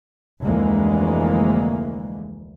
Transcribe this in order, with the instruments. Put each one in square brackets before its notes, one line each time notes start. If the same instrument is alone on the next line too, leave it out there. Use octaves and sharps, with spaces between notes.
[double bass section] F1 D2 E3 G#3 A#3